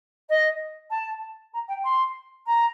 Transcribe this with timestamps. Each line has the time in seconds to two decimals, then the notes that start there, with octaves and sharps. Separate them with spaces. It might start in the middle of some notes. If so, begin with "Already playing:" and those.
0.29 D#5
0.90 A5
1.53 A#5
1.68 G5
1.84 C6
2.46 A#5